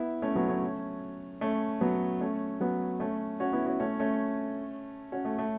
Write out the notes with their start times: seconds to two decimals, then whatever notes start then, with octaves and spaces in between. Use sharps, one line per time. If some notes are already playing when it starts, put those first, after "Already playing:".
Already playing: B3 E4
0.22 A3 C#4
0.35 F#3 B3
0.48 A3 C#4
1.41 A3 C#4
1.81 F#3 B3
2.21 A3 C#4
2.61 F#3 B3
3.00 A3 C#4
3.40 C#4 F#4
3.53 B3 E4
3.66 C#4 F#4
3.80 A3 C#4
3.99 A3 C#4
5.12 C#4 F#4
5.25 A3
5.38 A3